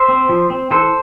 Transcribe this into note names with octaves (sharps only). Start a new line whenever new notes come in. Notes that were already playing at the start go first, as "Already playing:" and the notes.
Already playing: C5 E5
C4
F3
C4
E3 A4 C5